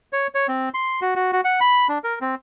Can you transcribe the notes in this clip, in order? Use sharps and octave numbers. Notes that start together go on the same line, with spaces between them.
C#5
C#5
C4
C6
F#4
F#4
F#4
F#5
B5
D4
A#4
C4